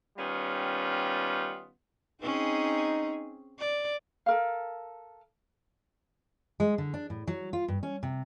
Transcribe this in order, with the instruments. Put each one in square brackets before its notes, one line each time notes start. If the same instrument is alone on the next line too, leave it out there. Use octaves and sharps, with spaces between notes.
[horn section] D#3 G3 B3 C#4 F4
[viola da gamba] C4 C#4 G#4 [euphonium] D#4
[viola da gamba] D5
[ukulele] A4 A#4 F5
[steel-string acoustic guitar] G#3
D3
D4
A2
F#3
F4
G2
C#4
C3